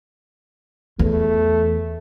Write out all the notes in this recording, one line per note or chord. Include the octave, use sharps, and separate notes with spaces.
E2 A3